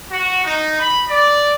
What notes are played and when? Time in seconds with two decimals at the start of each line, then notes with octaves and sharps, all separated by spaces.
0.11 F#4
0.44 D#4
0.80 B5
1.09 D5